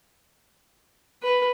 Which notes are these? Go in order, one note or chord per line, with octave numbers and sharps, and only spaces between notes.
B4